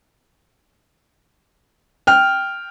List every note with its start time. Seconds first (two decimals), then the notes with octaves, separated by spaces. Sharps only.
2.07 G5 F6